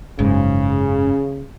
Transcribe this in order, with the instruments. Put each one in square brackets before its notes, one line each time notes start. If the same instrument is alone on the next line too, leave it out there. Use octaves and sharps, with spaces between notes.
[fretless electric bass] F#1 G#2 [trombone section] C#3